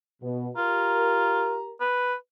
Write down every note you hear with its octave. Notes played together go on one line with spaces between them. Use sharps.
B2
F4 G4 A#4 A#5
B4